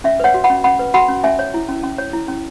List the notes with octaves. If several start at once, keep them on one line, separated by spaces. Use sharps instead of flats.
C#4 E5
B4 C#5 F#5
F#4
F#5 B5
C#4
C#4 F#5 B5
B4
F#4 F#5 B5
C#4
C#4 E5 G#5
C#5
E4
C#4
C#4
C#5
E4
C#4